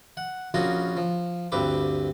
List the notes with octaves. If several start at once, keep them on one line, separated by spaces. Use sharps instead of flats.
F#5
A#1 C#4 F4 F#4 A#4 D#6
F3
D2 G2 C4 B4 D6